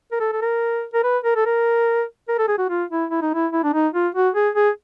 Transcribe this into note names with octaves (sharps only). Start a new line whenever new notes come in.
A#4
A4
A4
A#4
A#4
B4
A#4
A4
A#4
A#4
A4
G#4
F#4
F4
E4
E4
D#4
E4
E4
D4
D#4
F4
F#4
G#4
G#4